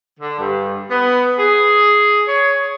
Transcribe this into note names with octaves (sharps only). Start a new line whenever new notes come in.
D3
G2
B3
G#4
C#5